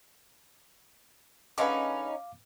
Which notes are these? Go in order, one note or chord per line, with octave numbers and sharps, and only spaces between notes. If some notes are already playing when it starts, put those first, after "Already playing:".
D3 G#3 C#4 D#4 B4 F5 D6